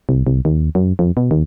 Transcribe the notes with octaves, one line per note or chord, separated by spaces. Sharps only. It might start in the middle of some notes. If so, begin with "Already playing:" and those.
C2
C2
D#2
F#2
F2
B2
D#2